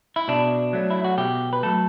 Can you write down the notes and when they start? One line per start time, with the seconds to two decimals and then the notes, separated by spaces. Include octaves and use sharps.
0.16 E4
0.28 B2 D4
0.73 F#3 A3
0.90 E4
1.04 F#4
1.18 B2 G4
1.53 B4
1.63 F#3 A3 A4